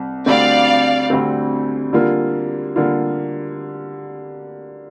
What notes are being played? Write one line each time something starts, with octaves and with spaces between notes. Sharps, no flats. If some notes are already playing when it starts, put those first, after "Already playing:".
Already playing: C2 C4
D2 D3 G3 C4 D5 F5
D2 D3 G3 C4
D3 G3 A#3 F4
D3 G3 A#3 F4